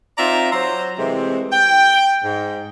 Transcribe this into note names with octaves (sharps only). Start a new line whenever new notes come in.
C4 D#4 F4 D5 E5 A#5
F#3 C5 A#5 C6
C3 E3 G#3 A3 C4
G5
G#2